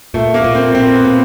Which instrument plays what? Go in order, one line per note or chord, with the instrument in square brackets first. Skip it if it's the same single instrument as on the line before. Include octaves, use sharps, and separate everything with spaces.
[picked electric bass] A#2 [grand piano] A3
[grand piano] A#3
[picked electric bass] A#2
[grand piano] C4
[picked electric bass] A#2 [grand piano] C4
[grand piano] B3
[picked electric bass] A#2